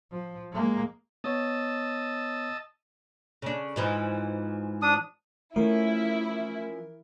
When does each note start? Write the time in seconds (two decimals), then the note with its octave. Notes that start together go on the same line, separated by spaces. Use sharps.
0.11 F3
0.53 G#3 A#3
1.24 B3 C#5 D#5 A5 E6
3.42 C#3 D4
3.76 G#2 E3 F3
4.82 D4 D#6
5.56 E3 F3 A3 C#4 E4 A#4